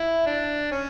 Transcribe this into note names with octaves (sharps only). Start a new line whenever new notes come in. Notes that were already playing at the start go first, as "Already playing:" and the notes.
Already playing: E4
D4
C#4